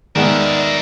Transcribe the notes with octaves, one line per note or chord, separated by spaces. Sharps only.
D#3 G#3 B3 A#4 D5 E5